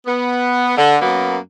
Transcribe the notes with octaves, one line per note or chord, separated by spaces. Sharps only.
B3
D3
F#2 F#3 A#3 B3